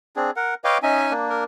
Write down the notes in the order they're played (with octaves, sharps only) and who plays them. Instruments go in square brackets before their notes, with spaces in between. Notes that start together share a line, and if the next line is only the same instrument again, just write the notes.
[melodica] C4 D4 G#4
A#4 F#5
[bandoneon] B4 D#5 F5 [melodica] C#5 G5 D6
[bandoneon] C#4 D#4 G#5 [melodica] D#5 E5
[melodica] A#3 D4
[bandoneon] A#4